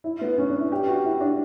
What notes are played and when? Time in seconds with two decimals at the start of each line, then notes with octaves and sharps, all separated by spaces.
0.04 E4
0.21 B3
0.38 C#4
0.50 D4
0.60 E4
0.72 G4
0.88 F#4
1.05 E4
1.21 D4